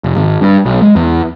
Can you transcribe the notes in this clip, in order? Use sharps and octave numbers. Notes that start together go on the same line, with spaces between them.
F1
G#1
G2
B1
G#3
E2